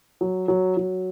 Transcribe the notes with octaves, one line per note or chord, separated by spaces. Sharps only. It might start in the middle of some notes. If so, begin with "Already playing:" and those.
F#3
F#3
F#3